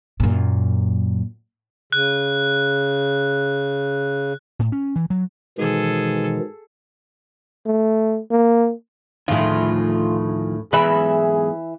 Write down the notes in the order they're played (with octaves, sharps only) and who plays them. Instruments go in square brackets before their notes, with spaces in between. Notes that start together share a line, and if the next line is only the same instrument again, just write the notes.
[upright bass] F#2 A#2
[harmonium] C#3 [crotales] F#6
[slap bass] A2
C#4
E3
F#3
[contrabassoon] G#2 [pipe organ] B2 D#3 E3 [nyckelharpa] G#4 A4
[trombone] A3
A#3
[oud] D2 A2 E4 [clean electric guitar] D#3 F3 G#4 [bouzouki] F4
[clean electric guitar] E2 G#2 B5 [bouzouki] E3 E5 [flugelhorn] G#4 [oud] B4